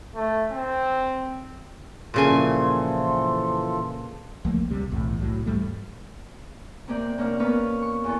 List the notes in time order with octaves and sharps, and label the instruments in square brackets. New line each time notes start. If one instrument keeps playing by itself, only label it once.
[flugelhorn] A3
C4
[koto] A#2 C#3 G#5 [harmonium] E3 F3 A4 [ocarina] C6
[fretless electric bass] C#2 F3 A3 A#3
C#2 C3 G3
B1 E2 A2
C2 A2 F#3
E2 G#2 G3 A3
[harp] C3 A#3 D5 G6
A#3 C#4 D4 F5
A#3 B3 C#4 B4 C#5 F5
C#6
E2 A4